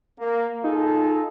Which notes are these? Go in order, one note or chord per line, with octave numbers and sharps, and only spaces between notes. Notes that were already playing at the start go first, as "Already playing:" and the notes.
A#3
D#4 F4 G#4 A4